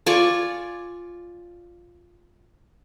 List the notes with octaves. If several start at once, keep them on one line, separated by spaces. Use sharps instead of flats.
F4 D5 G#5 C#6